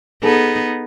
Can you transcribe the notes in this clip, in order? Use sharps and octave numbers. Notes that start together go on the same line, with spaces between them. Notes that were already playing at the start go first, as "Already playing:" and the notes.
B3 D#4 G#4 A4